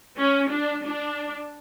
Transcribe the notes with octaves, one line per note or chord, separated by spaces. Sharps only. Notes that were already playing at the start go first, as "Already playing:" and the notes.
C#4
D4
D4